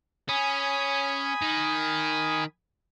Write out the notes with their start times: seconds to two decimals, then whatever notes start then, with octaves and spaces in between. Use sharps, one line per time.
0.29 C#4 G#5 B5 D#6
1.42 D#3